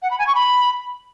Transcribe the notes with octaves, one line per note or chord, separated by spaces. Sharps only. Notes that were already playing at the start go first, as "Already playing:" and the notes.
F#5
B5
G#5
C#6
B5